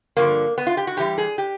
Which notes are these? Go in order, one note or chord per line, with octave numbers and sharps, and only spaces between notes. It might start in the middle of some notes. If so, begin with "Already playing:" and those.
G2 D3 F3 A#3
B3
F4
G4
F#4
A2 E3 G3 G4
G#4
G4